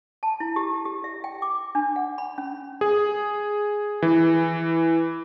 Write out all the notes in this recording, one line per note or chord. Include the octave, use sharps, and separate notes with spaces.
A5
E4
G4
G4
E5
G5
D6
D4
F#5
B5
C#4
G#4
E3